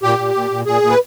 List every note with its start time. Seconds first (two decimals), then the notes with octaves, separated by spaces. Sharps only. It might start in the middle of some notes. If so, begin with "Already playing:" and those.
0.03 A#2 G4
0.18 A#2
0.35 A#2
0.51 A#2
0.66 A#2 G#4
0.82 A#2
0.90 B4